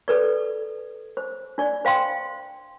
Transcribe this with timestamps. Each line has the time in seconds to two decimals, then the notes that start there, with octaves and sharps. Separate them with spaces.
0.08 A4 B4 D5
1.17 C5
1.58 D4 D5
1.85 C5 F5 G5 C6